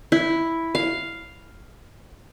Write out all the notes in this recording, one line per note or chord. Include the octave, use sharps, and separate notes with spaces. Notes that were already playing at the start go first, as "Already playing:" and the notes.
E4
F5